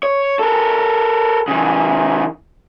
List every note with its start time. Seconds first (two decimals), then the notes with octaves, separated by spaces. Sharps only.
0.03 C#5
0.39 A4 A#4
1.48 C#3 E3